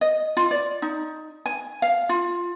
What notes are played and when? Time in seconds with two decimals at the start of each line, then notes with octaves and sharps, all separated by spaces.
0.01 D#5
0.37 F4
0.51 D5
0.82 D#4
1.46 G#5
1.82 F5
2.09 F4